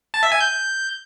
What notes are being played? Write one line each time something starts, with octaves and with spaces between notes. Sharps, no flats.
A5
E5
G#5
G6